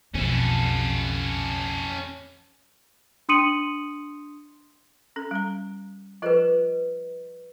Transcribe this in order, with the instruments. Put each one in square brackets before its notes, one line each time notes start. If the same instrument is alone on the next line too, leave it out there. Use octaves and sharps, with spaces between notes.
[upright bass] B1 C#3 [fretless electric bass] F2 [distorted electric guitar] C#4 A4
[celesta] D4 C6 D#6 C#7 D#7 F#7
[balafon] C#4 A4
G3 A#5
[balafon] F3 F4 A4 [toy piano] B4 C5 D#5